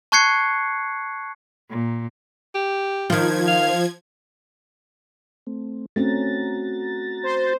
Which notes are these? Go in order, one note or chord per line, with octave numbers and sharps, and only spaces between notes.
A5 C#6 F#6 G#6 C7 C#7
A#2
G4
D#3 F3 F4 G#6
F5
A3 C4
A3 C4 C#4 F#4 A#5 A6
C5